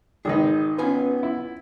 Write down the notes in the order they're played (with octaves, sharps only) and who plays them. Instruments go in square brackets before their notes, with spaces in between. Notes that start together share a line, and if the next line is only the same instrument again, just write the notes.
[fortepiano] G#1 D#3 D#4 [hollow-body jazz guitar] G#4 B4
[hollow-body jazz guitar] B3 F4 G#5 [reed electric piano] C#4 B4
[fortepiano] E4